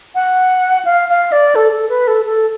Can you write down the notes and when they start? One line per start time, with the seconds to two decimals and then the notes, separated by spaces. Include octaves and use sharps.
0.15 F#5
0.85 F5
1.09 F5
1.32 D5
1.55 A4
1.72 A4
1.89 B4
2.08 A4
2.25 A4